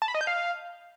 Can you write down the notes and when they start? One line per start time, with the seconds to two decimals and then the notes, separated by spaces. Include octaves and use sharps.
0.02 A5
0.08 B5
0.14 D#5
0.21 G6
0.27 F5